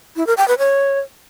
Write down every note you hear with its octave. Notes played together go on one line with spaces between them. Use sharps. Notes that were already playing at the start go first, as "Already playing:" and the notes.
E4
A#4
G5
B4
C#5